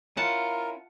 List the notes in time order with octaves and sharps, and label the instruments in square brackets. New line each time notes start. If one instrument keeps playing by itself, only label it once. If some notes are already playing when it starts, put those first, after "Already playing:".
[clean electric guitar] C#4 E4 [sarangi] F4 [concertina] A#4 [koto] F#5 A5